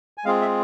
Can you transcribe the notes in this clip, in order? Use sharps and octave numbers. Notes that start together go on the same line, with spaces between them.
G#5
G#3 C4 F4 G#4 F5
E5